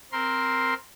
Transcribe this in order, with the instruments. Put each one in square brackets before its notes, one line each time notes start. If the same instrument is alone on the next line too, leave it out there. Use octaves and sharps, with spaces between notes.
[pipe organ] C4 A#4 C6